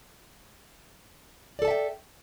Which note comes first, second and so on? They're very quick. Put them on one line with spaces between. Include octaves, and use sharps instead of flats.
D5 A4 A5 E5 G5